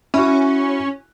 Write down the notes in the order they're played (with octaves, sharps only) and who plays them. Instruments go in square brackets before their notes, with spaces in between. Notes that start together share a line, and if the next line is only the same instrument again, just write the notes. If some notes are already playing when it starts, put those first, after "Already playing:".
[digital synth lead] C#4 [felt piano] E4 F#4